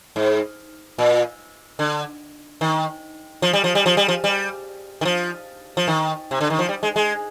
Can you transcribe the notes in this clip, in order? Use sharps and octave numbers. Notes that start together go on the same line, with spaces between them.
G#2
A#2
D3
D#3
F3
G3
F3
G3
F3
G3
F3
G3
D#3
F3
F3
D#3
C3
D3
D#3
F3
G3
G#3
G#3